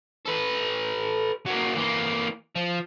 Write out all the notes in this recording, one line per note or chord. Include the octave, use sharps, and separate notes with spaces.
A4 B4
F#3 A#3
E3 A#3
F3